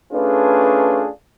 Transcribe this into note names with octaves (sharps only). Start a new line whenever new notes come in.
A3 C#4 D4 F4 G#4 B4